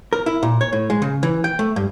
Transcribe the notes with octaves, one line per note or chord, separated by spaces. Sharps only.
A#4
E4
A#2
C#5
A2
G#3
C#3
E3
G5
A3
G2